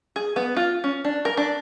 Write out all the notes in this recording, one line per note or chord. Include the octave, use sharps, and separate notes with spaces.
G#4
B3
F4
C#4
D4
A#4
D4